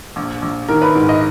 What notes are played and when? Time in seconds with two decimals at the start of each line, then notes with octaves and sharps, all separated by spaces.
0.16 A#1
0.42 A#1
0.68 D#3 A#4
0.82 B4
0.95 G#2
1.09 D#5